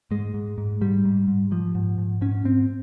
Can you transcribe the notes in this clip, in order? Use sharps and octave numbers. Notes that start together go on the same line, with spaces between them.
G#2 G#3
G#2
G#2
G#2 G3
G#2
G#2
G#2 F3
G#2
G#2
G#2 C#4
G#2 C4